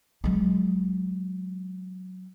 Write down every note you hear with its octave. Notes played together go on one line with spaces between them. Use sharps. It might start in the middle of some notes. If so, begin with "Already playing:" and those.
F#3 G#3